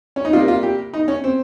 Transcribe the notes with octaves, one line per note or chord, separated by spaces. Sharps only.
C#4
D#4
C3 G3 A#3 F4
F4
G4
D#4
C#4
C4